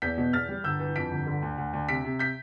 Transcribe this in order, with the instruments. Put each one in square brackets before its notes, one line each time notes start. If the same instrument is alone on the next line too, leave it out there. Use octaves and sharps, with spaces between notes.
[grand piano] E2 G6 B6
B2
E2 F6 A6
G3
G1 E6 G6
E3
F2 B6 D7
G1
D3
D2
D2
D2
C3 B6 D7
C3
G6 B6